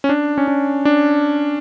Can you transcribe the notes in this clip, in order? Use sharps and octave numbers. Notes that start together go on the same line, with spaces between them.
C#4
D4
C#4
D4
D4